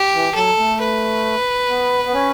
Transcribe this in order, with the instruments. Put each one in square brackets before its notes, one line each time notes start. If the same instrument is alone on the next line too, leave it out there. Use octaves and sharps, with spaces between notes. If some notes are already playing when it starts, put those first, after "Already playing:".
Already playing: [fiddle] G4
[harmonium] E3
[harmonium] F#3 [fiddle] A4
[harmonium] A3
[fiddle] B4
[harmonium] B3
B3
C#4